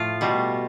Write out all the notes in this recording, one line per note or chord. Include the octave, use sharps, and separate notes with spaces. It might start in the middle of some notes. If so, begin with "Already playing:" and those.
Already playing: A2 F3 A3 F4
B2 G3